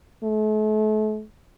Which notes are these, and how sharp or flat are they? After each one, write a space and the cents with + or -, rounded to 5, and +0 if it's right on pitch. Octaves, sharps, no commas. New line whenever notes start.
A3 -40